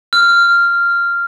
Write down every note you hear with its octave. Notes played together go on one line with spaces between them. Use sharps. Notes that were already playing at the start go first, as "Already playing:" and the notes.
F6